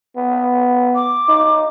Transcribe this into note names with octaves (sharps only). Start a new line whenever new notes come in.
B3
D6
D#4